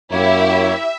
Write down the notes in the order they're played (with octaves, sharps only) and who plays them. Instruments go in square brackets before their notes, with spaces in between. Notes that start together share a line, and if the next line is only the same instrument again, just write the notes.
[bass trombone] F#2 [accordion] A#3 C#5 [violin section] E4 G4 [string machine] E5